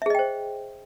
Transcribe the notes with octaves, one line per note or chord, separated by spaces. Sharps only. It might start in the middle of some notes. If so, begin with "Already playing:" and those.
G#4 C5 D#5 E5 G5